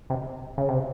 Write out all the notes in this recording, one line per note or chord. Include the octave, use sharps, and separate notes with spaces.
C3
C#3
C3